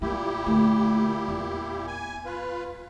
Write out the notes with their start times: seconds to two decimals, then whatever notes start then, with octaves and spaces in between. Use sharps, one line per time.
0.02 A#2 A3 A#3 E4 G4
0.46 D3 A3
1.28 E2
1.87 G#5
2.25 F4 B4